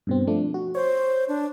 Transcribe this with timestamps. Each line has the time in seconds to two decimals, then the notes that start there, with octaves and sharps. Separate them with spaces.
0.07 G2 B2 C4
0.27 F3 A3 D4
0.54 F#4
0.75 C5 C#5
1.29 D4